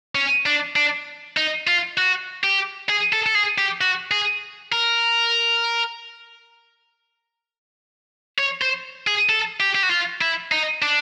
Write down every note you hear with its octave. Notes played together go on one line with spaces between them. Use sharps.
C#4
D4
D4
D#4
F4
F#4
G4
G#4
A4
A4
G#4
G4
F#4
G#4
A#4
C#5
C5
G#4
A4
G4
G4
F#4
F4
E4
D#4
D4